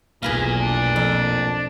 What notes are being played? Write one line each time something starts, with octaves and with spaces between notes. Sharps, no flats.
F1 B1 E2 A#2 G#4 B4 F5
D4
F2